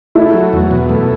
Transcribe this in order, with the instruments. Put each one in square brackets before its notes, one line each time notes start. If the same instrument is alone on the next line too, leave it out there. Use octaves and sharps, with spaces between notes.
[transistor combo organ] A3 [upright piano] E4
[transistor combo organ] F#3
E2
B2
A3